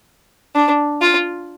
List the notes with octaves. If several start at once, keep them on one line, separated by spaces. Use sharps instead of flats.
D4
F4